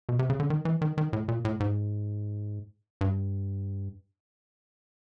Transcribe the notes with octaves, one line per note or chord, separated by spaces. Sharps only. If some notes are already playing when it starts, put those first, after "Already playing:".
B2
C3
C#3
D3
D#3
E3
D#3
D#3
A2
A#2
A2
G#2
G2